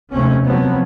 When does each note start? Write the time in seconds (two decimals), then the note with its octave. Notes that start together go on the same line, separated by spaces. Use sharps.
0.11 F1 D#2 A3 C4 C#4
0.44 F3 F#3 B3 C4